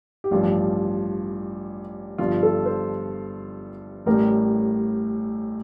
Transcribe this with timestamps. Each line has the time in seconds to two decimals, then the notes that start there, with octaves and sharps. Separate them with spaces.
0.24 G4
0.31 A1 G2 F3 F4
2.18 G1 G2 F3 F4
2.43 A4
2.66 C5
4.06 A1 A2 G3 A#4